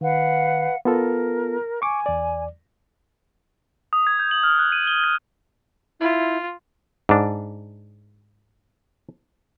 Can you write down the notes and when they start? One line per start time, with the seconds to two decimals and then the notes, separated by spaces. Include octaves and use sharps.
0.01 D#3 B4 F5 F#5
0.85 B3 F4 A4 A#4
1.82 G#5 C#6 D6
2.06 E2 D5
3.93 D#6
4.07 G#6
4.19 G6
4.31 F#7
4.43 F6
4.59 F#6
4.72 D#7
4.87 G7
5.04 G#6
6.00 E4 F4
7.09 G#2 D4